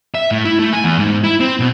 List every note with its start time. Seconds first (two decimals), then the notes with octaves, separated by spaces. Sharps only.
0.15 E5
0.31 A2
0.45 E4
0.59 A3
0.73 G#5
0.84 E2
0.99 G#2
1.24 E4
1.40 C4
1.60 B2